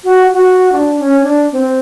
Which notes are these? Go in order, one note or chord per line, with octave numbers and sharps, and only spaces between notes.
F#4
F#4
D4
C#4
D4
C4